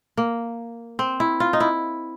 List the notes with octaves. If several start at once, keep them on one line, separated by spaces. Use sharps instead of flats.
A#3
C4
E4
F4
D#4
E4